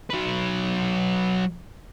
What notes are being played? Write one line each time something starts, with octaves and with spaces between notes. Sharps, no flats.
F#3 B4